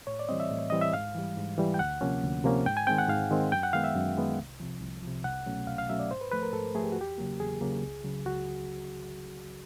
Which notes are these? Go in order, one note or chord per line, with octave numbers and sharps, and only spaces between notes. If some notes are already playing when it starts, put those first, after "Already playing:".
A2 C#5
D5
E3 G3 C4 D#5
E5
A2
E3 G3 C4 D#5
E5
G#2 F5
E3 G3
G#2
E3 G3
G5
D2 F#5
C3 F3 A#3 C#4
D2
C3 F3 A#3 C#4
G#2 G5
G#5
D#3 G#3 C4 G5
F#5
G#2 F5
D#3 G#3 C4
F#2 G5
F#5
D#3 G#3 B3 F5
E5
F#2
D#3 G#3 B3
C2
C3 F3
C2
C3 F3
C2 F#5
B2 F#3 A3 C#4
C2 F5
F5
B2 F#3 A3 C#4 E5
D5
G#2 C5
B4
F3 A3 B4
A#4
G#2 A4
F3 A3 G#4
G4
F#4
E2 G4
C#3 F#3 A#3
E2 G#4
C#3 F#3 A#3
C#2
C#3 F#3
C#2 F#4